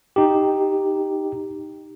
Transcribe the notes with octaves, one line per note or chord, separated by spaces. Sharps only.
D#4 G4